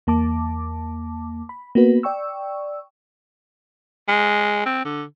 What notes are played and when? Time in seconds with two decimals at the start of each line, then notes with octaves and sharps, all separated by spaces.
0.07 E2 A#3 A5 D6
1.49 B5
1.75 A#3 B3 F#4 B4
2.03 D5 G5 C#6 E6
4.08 G#3
4.66 C4
4.85 D3